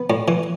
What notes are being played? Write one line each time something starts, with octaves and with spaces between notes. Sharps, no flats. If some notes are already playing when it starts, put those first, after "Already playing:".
Already playing: B3
A2
E3